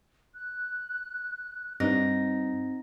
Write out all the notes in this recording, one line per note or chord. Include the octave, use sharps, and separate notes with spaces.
F#6
G2 C4 D#4 A#6